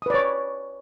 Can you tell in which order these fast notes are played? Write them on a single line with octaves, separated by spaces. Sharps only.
D#6 B4 D5 C#5 D6